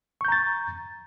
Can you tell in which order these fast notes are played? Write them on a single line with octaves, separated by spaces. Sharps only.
C#6 G6 A#5 A6